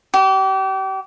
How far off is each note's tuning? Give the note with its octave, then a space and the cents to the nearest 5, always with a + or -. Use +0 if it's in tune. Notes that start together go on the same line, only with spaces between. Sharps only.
G4 -35